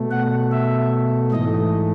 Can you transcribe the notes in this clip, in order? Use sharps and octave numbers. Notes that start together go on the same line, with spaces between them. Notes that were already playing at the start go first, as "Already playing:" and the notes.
Already playing: B2 A3
F#5
E5
G#2 E3 A3 D#5